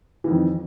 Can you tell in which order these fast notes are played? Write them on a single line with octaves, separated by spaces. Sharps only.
E3 D#3 F2